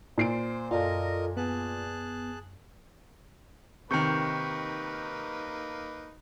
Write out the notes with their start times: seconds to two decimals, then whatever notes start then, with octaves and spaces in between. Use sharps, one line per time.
0.18 A#2 C5 C7 D7
0.71 F#2 F4 A4 A#4 D5 D#5
1.37 B3 G#4 A5 F#6
3.91 C3 D#3 A#3 D#4 B4 C#6 G6 C#7